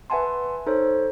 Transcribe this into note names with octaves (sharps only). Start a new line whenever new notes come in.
B4 E5 F#5 G#5 A5 C6
D#4 A4 C5 C#5